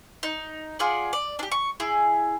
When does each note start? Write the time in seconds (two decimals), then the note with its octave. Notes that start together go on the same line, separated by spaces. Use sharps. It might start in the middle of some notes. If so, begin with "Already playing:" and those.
0.23 D#4
0.79 F4 G#4 D5 F#5
1.13 D5
1.39 D4 G4
1.51 C#6
1.80 E4 G#4